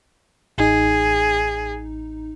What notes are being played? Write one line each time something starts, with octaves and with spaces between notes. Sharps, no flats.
A1 D#4 G#4